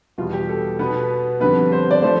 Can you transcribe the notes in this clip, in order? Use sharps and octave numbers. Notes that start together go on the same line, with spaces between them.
E2 B2 G3 F4
G4
A4
B2 B3 B4
F2 D3 G3 B3 B4
C5
D5
F3 A3 C5